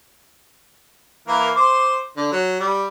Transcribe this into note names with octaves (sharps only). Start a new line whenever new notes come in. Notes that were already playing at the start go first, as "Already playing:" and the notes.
E3 A#3 A#4
C5 C6 D6
D3
F#3
G3